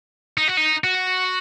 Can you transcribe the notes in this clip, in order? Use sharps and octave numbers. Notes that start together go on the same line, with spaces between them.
D#4
F#4
D#4
F#4